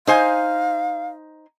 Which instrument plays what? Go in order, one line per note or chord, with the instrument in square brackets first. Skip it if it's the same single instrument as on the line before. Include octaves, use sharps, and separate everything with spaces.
[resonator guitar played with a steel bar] D#4 C5 G#5 [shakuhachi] F5